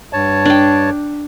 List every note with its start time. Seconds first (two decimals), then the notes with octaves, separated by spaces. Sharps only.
0.13 G2 C#5 A5
0.45 D4 G5